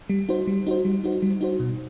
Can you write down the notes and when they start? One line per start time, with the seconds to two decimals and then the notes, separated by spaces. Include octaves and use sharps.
0.10 G3
0.29 D#4 F#4 C5
0.47 G3
0.67 D#4 F#4 C5
0.85 G3
1.04 D#4 F#4 C5
1.22 G3
1.41 D#4 F#4 C5
1.60 B2